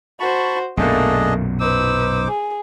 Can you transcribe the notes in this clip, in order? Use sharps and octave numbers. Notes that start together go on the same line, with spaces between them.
F#4 C5 A5 B5 C#6
B1 F#2 A#2 A3 A#3 D4 G#4 D#5
D#4 B4 C5 D6 E6
G#4